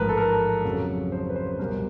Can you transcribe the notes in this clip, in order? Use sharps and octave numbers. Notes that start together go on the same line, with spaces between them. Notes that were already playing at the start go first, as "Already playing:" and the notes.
Already playing: A1 G#2 F3 A#4 B4
A4
A#4
F2 C#3 F#3
C5
B4
C5
C2 B2 G3 A#4